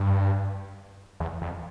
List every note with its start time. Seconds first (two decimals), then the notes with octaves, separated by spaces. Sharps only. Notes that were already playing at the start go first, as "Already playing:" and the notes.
Already playing: G2
1.20 E2
1.42 F2